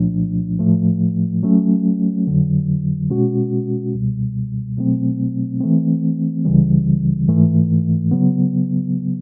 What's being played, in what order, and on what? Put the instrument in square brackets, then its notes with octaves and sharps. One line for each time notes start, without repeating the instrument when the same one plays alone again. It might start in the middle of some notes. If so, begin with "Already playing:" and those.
Already playing: [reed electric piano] C2 A#2 F3 A3 D4
A2 F3 A3
F#3 A3 C#4
F2 D3 F#3
B2 G#3 C#4 F#4
C#2 B2 G3
B2 F#3 A3 C4
E3 A3 C4
C#2 C#3 E3 G3
G#2 E3 A3
C#3 F#3 B3